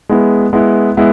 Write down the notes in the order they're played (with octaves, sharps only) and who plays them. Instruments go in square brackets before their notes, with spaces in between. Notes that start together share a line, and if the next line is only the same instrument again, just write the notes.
[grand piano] G#3 B3 E4
G#3 B3 E4
G#3 B3 E4